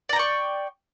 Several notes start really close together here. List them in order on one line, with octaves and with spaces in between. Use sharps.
D5 A#5 G5 C#6